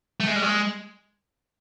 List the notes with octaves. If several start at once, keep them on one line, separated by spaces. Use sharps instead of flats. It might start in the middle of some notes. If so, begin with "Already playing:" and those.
A3
G#3
G3
G#3